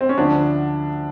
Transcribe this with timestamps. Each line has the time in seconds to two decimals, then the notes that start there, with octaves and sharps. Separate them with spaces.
0.01 C4
0.09 C#4
0.18 D2 D3 F3 D4